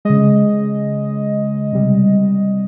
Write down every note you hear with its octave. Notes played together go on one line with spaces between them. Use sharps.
C#3 G#3 D#5
C3 G3